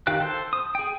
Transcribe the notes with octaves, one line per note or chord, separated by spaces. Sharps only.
D#3 G4 F5 G5 F#6
A4 C5
D#6
G#4 G5